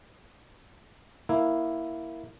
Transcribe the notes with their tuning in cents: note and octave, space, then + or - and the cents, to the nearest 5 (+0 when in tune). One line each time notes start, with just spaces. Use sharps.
A#3 +0 E4 +0